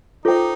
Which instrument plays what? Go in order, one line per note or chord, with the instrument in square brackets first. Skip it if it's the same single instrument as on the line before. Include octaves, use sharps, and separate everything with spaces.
[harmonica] D#4 [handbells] F4 A4 C5 G5